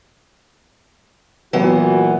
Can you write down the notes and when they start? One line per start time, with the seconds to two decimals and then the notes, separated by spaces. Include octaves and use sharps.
1.53 A#2 E3 F#3 B3 F#4 F#5